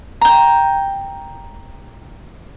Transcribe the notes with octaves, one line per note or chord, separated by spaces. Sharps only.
G5 A#5